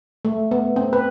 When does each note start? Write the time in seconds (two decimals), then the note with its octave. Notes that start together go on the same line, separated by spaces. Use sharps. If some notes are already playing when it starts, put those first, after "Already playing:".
0.25 A3
0.51 B3
0.76 C4
0.93 B4